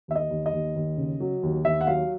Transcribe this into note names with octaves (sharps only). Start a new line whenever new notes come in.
D#2 E5
D#5
D#2
D#5
D#2
D#2
C#3
F#3
D#2
D#2 E5
F#5
F#3 F5